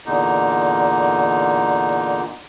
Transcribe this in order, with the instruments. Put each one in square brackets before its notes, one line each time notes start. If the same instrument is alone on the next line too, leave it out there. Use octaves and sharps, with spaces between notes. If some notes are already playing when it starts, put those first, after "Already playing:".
[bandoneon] E2 A#2 D3 D#4